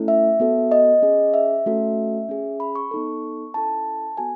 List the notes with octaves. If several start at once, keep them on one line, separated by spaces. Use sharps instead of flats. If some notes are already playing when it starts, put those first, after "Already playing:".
Already playing: A3 C#4 E4 A4
E5
B3 F#4 A4
D#5
C#4 G#4
E5
A3 C#4 F#4 A4
C#4 G#4
B5
C#6
B3 D#4 A4
C#4 E4 A4 A5
B3 F#4 A4 G#5